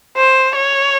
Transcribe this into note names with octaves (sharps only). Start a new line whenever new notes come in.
C5
C#5